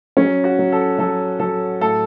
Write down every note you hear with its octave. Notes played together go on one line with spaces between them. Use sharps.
F#3 C#4
F#4
F#3
A4
F#3 A4
F#3 A4
A2 A4